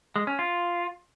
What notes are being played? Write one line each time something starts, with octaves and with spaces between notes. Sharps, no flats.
G#3
C#4
F4